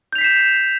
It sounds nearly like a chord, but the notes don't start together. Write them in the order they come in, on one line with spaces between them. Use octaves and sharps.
G6 F7 B6 C7 E7